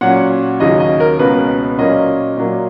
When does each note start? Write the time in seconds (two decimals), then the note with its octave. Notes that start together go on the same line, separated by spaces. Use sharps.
0.01 A#2 F#3 C#4 F#5
0.60 D#2 C#3 F#3 C#4 D#5
0.80 D#5
1.00 A#4
1.19 C#2 B2 A#3 C#4 B4
1.78 A#2 F#3 A#3 C#4 D#5
2.37 A#2 F#3 A#3